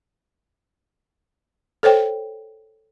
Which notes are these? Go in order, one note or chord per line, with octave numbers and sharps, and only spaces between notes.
A4 C5 C#5 G5